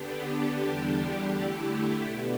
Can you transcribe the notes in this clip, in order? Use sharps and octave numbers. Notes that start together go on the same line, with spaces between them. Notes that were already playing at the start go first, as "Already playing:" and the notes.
Already playing: D3 B3 D4 G4
E2 D3 G3 D4 G4
D3 A3 E4 G4
B2 B3 D4